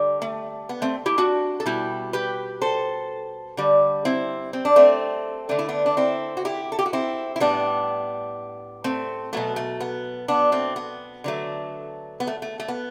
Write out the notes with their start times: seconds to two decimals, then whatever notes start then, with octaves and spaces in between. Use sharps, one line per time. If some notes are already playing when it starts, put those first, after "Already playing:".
Already playing: D3 G3
0.22 A3
0.69 B3
0.82 A3 C4
1.06 E4 G4
1.18 D4 F#4
1.60 A4
1.66 B2 G3 E4 G4
2.13 G4 B4
2.62 A4 C5
3.57 D3 G3
4.05 C4 E4
4.53 C4
4.65 D4
4.76 A3 C4
5.49 D3 A3 D4
5.59 E4
5.69 B3 D4
5.86 D4
5.97 C4 E4
6.37 F#4
6.45 E4 G4
6.72 A4
6.79 G4
6.86 F#4
6.93 C4 E4
7.36 E4
7.40 A2 G3 B3 D4
8.84 A3 C4
9.33 B2 F#3 A3 B3
9.56 A3
9.80 B3
10.28 B3 D4
10.52 A3 C4
10.76 B3
11.24 D3 F#3 A3
12.20 B3
12.27 A3
12.42 A3
12.60 A3
12.68 B3